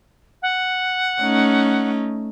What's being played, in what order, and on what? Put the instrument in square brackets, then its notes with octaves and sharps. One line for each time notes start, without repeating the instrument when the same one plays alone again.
[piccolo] F#5
[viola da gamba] A3 C#4 D#4